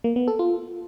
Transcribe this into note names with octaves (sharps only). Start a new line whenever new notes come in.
A#3
B3
A4
F4